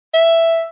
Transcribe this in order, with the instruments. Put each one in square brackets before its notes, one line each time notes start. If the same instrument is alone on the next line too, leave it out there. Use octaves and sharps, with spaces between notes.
[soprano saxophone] E5